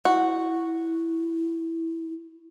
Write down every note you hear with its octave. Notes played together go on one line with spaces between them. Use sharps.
E4 F#4